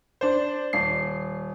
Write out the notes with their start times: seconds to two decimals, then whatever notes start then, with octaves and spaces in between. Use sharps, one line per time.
0.21 D4 C5
0.73 D#1 C7